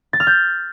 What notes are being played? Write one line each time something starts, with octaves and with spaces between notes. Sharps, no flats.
A6
F6
G6